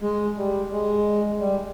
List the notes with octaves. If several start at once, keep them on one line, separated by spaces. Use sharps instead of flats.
G#3
G3
G#3
G3